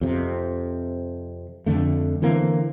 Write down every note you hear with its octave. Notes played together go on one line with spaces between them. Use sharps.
F2 C3
F2 D3 A3
D3 E3 A#3 C4